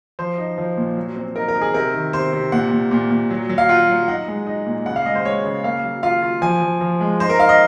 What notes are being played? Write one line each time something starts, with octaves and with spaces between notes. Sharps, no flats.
F3 C5
D#4
F3
A#2
F#3
C4
D#4 A#4
A#4
D#4
G#4
C3 A#4
D#3
C3 C5
C3
A#2 F#5
A#2
A#2
A#2
F#3
F#3
F5
F4 F#5
F#3
D#4 F#5
G#3
D#4
A#2
C#3 F#5
F5
G#3 D#5
C5
G#3 C#5
C#3
A#3 F5
F#3
F4 F5
F4
F3 G#5
F3
F3
G#3
D#4 C5
A#4
D#4 F5
D#5